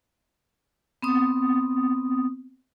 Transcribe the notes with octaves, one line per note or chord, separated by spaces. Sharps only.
B3 C4 D#6